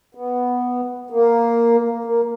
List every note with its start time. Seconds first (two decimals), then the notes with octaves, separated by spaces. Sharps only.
0.15 B3
1.10 A#3
2.05 A#3